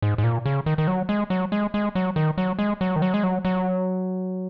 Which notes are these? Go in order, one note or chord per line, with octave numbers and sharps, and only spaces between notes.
G#2
G#2
A#2
C#3
D#3
D#3
F#3
G#3
F#3
G#3
G#3
F#3
D#3
F#3
G#3
F#3
D#3
F#3
G#3
F#3
F#3